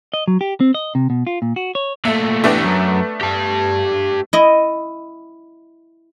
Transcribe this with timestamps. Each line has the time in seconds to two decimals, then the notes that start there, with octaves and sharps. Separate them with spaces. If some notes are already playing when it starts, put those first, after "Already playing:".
0.14 D#5
0.28 F#3
0.41 G4
0.60 C4
0.74 D#5
0.95 C3
1.10 B2
1.27 F4
1.42 A#2
1.56 F#4
1.75 C#5
2.05 A#2 A3 E5
2.44 E3 A3 B3 D4 G4
2.64 F#2
3.21 G4 A5
4.33 E4 D#5